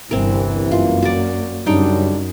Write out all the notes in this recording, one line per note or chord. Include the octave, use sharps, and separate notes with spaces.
G1 C2 E3 C4 A#4
F#2 A#3 F4
F#4 D5
F#2 C#3 G3 D4 D#4 G5